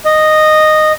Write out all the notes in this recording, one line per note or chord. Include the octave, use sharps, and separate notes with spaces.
D#5